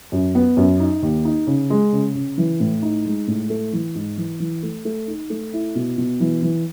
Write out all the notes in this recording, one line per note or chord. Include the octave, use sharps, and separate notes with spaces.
F#2
B3
F#2
D#4
D#2
D#4
C#3
G#3
C#3
C#3
E3
A2
D#4
G#3
A2
A3
E3
G#2
E3
E3
A3
A3
D#4
A3
E4
B2
B2
E3
E3